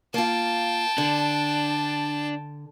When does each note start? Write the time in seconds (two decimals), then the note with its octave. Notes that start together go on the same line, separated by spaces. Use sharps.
0.14 A#3 F4 G5 A5
0.98 D3 D4